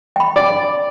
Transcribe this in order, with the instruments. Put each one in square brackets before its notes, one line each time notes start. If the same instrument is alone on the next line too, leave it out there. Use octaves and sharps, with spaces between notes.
[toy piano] G5 B5
[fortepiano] D5